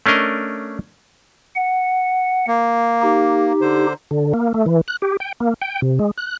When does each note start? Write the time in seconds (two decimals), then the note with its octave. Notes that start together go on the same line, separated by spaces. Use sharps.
0.06 A3 C#4 D4 A#4 D#5
1.56 F#5
2.47 A#3
3.03 D#4 G4
3.61 D3 C5
4.11 D3
4.34 A#3
4.54 A3
4.66 E3
4.88 F#6
5.02 G4
5.20 G5
5.40 A#3
5.62 G5
5.82 C3
5.99 G#3
6.18 F#6